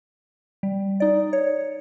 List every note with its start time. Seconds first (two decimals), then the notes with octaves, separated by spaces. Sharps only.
0.63 G3
1.00 D#4 D5
1.33 C#5